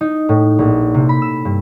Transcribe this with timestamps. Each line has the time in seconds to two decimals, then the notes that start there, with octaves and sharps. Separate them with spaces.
0.01 D#4
0.29 A2
0.59 A#1
0.94 C3
1.09 B5
1.22 E6
1.45 G2